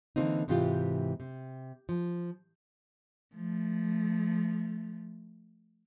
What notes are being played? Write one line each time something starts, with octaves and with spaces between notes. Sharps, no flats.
D3 E3 G3 A#3 C4 D#4
G#2 C3 E3 G#3 F4 G4
C3
F3
F3 A3